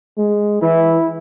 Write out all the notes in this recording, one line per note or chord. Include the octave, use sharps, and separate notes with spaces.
G#3
E3 E4